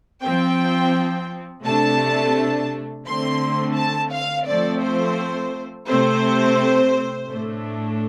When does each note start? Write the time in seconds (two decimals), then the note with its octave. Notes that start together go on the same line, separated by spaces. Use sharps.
0.23 F3 C4 G5
1.65 C3 A3 D4 A5
3.06 D3 A3 C4 C6
3.77 A5
4.12 F5
4.47 F3 A3 C4 D5
4.82 C5
5.88 C3 A3 C4 C5
7.30 A2 A3 D4